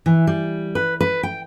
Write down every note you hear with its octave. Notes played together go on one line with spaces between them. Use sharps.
E3
G3
B4
B4
G5